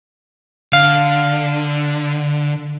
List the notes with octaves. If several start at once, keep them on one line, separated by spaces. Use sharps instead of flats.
D3 F5